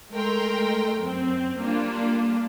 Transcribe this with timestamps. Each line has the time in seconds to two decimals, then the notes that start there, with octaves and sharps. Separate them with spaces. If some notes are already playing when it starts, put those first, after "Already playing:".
0.12 G#3 A3 A#4 G5 C6
0.99 F#2 C4
1.59 G3 A#3 D4 F4